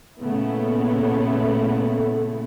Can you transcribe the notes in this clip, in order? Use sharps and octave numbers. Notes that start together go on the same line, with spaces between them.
A#2 C#3 A3 B3 E4